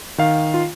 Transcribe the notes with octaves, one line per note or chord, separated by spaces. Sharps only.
D#3 F5
F4